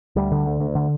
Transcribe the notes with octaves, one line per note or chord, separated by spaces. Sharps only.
D2 G3
D3
D2
D2
D3